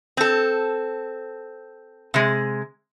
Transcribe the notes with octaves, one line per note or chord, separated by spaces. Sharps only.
C4 A4
C3 G#3